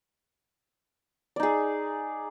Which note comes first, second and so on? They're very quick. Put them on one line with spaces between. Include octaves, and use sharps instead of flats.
D5 D#4 G#4